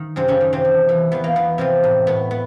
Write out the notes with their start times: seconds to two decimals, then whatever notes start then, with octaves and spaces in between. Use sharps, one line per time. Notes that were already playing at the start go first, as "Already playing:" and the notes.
Already playing: D#3
0.16 F#2 C3 C4
0.28 C#3 C#4
0.41 D#3
0.53 C3 C4
0.65 E2
0.89 E3
1.12 E2 B3
1.24 A#3
1.36 E2 B3
1.58 C3 F3 C4
1.84 A2
2.07 A2 B3
2.31 B3